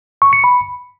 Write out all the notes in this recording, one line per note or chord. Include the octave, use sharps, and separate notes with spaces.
C#6
C#7
B5